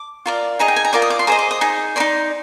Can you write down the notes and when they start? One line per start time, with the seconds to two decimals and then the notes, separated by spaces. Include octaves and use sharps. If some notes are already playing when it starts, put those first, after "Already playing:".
Already playing: D6
0.26 F4 A#4 D5
0.59 D#4 G#4 D#5 A#5
0.68 G5
0.76 G#5
0.84 A#5
0.93 F4 A#4 D5 D6
1.02 D#6
1.10 D6
1.19 C6
1.27 G#4 C5 D#5 A#5
1.39 D6
1.51 D#6
1.61 D#4 G#4
1.96 A#4 D5 C6
2.00 D#4